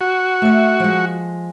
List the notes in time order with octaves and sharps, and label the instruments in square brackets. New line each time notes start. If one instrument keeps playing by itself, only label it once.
[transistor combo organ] F#4
[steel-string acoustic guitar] A3 E5
F3 G#3